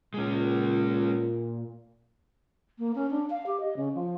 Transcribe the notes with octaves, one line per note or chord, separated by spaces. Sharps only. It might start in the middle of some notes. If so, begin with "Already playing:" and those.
A#2 G#3 C#4
A#3
C#4
D4
F5
G4
D#5
C#3
F3